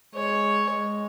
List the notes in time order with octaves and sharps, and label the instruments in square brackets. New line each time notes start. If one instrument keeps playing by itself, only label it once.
[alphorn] G#3 [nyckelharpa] C#5
[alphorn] G#3